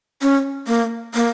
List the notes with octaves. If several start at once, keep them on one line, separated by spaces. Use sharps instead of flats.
C#4
A#3
A#3